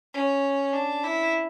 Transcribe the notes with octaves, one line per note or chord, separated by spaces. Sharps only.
C#4
D4
E4